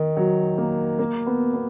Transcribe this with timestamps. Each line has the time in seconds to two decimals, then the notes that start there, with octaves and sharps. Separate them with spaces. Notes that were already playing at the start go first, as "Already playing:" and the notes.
Already playing: D#3
0.17 F#3
0.58 A#3
0.99 A#3
1.27 B3
1.54 B3